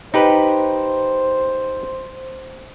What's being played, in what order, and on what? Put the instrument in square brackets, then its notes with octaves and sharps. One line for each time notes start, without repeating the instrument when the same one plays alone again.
[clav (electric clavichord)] D#4 G4 B4 [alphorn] C5